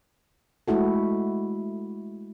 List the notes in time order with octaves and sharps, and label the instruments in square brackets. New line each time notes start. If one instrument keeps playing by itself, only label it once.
[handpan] G#3 A3 E4 F#4 A4